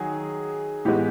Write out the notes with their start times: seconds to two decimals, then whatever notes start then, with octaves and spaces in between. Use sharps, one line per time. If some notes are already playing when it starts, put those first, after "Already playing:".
Already playing: D#3 F#3 G#4
0.85 A2 E3 G#3 B3 G4